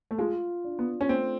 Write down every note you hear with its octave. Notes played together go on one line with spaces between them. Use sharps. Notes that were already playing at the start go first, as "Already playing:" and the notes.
A3
G#3 F4
D4
B3
C#4
A3 C4